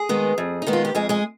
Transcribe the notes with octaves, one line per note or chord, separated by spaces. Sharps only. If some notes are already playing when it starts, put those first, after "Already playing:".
Already playing: G#4
D#3 G#3 B3
F2
D#4
D#3 G#3 B3
F4
G4
F2 G#3 G#4
G#3 G#4